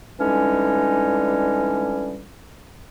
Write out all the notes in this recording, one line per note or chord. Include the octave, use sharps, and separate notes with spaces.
D3 E3 G3 G#3 C#4 D#4